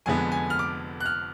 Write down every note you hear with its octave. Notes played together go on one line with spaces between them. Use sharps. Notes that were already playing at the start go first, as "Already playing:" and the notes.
F1 F2 D3 G#3 B3 G#5
G#5
F6
D6
F#6
F6